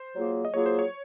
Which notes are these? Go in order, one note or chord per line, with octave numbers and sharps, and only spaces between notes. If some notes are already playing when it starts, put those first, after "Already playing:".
Already playing: C5
F#3 A#3 F4 G#4
D#5
F#3 A#3 F4 G#4 C#5
C5
C#5